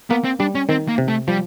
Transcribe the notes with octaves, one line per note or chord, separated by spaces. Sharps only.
A#3 B3
C4
G3 D4
C#4
D#3 C4
A#3
C3
A3
F3 G3